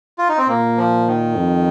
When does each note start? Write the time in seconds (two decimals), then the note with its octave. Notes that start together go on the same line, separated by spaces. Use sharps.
0.19 F4
0.29 D#4
0.38 C4
0.49 A#2 A#3
0.77 F3
1.07 D#3
1.36 F2